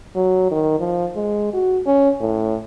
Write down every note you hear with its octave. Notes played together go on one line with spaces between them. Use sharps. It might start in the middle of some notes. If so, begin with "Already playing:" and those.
F#3
D#3
F3
G#3
F#4
C#4
A2